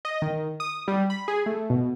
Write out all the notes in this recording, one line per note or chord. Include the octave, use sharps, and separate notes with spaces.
D#5
D#3
D#6
G3
B5
G#4
A3
B2